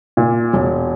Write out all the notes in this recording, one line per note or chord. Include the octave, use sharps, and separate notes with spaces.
A#2
E1